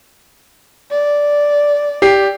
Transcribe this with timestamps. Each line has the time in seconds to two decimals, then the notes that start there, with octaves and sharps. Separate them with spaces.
0.91 D5
2.02 G4 C7